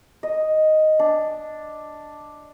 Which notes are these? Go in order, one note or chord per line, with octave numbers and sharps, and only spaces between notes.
D#5
D4